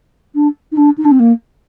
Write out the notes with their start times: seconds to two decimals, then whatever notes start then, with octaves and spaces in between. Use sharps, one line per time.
0.35 D4
0.72 D#4
0.77 D4
0.97 D#4
1.05 D4
1.11 C4
1.19 A#3